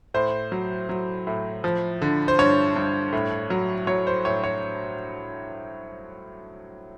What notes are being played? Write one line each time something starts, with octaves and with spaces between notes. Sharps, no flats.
A2 C5
F#3
F#3
A2
F3
D3
C5
G2 C#5
G2
A2
F#3
F#3 C#5
C5
A2 C#5
C#5